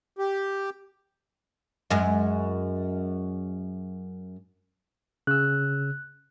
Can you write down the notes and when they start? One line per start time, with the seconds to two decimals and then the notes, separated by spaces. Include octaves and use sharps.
0.18 G4
1.90 F#2 G#3
5.27 C#3 E6 F#6